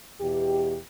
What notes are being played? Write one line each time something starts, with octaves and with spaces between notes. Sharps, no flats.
E2 B2 G4